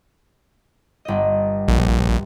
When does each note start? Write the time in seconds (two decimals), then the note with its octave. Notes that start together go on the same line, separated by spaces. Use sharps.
1.05 G1 D#5
1.68 A#1